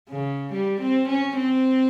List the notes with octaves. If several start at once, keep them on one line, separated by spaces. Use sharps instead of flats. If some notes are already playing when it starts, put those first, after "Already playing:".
C#3
G3
C4
C#4
C4